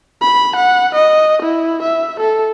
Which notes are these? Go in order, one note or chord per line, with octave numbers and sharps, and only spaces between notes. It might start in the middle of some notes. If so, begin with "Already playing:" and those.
B5
F#5
D#5
E4
E5
A4